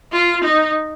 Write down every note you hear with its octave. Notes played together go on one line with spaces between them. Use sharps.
F4
D#4